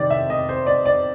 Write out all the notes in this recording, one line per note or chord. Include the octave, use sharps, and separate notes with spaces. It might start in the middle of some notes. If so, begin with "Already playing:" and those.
Already playing: C3 D#3 C4 D5
E5
D#5
C5
D5
D5